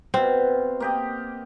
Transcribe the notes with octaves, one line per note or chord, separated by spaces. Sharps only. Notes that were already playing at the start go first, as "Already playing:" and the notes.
B2 C4 F5
A#3 G4 D#5